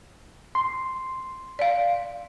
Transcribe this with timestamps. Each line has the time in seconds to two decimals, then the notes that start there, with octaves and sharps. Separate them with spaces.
0.55 C6
1.59 D5 F5